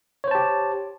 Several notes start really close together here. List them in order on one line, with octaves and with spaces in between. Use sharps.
C#5 C5 A5 G4